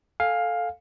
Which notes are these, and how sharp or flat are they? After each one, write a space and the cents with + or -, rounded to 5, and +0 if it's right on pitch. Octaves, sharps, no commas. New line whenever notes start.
A4 +0 F5 +10 G#5 -20